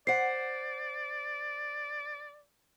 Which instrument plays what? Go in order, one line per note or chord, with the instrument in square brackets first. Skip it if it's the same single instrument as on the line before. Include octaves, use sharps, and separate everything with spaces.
[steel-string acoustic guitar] C5 F#5 [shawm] D5 [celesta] C7